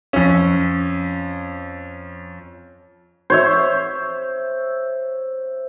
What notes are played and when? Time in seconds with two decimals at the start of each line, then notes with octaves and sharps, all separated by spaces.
0.13 F2 C#4
3.30 C5 C#5 E5